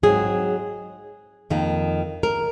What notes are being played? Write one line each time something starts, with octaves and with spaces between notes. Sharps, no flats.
G#2 F#3 C4 G#4
F2 D#3 A#3
A#4